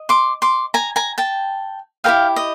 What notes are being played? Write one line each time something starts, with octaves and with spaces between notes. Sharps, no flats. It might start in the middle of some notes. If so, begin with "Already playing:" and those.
Already playing: D#5
C6 D6
C6 D6
G#5 A#5
G#5 A#5
G5 A5
E4 G4 A#4 D#5 F5 G5
D#5